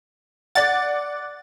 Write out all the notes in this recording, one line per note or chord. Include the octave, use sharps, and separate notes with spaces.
D5 F#5 A6